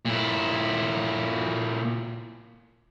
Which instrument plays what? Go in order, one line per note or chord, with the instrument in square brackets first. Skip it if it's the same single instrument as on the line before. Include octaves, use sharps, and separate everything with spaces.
[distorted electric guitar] A#2 E4